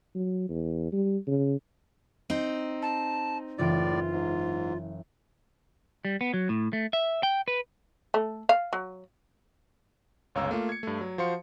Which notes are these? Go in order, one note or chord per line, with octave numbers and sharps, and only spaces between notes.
F#3
E2
G3
C#3
C4 D#4
A5
F#1 A2 E3 F4 D5 D7
G#2
G3
B3
F#3
A2
A3
E5
G5
B4
A3
F5
F#3
G1 C#2 C#5 F5 A#5 E6
A3 A#3 F4
G#6 C#7
G2 A3
F#3
F3 F#4 C5 F5 C6 C#7